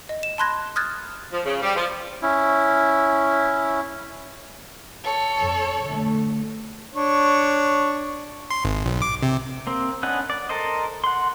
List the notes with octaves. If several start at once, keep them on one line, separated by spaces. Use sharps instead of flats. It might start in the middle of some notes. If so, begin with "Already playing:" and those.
D#5
E7
A5 B5 C6 F#6 G#6 A#6
D#6 F6 F#6 G#6 A6
F3
C#3
G3
F3
C#4 E4
A4 C#5
F2
D3 A3
D4 C#5 C#6
C6
G#1
B1
D6
C3
A#3 C4
B3 C#4 D4 D#5 F#5
D5
A4 A#4 C5 D#5
F#5 C6